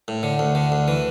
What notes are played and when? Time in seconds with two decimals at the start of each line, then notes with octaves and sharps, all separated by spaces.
0.08 A2
0.23 D3
0.39 D2
0.55 D3
0.72 D2
0.88 E3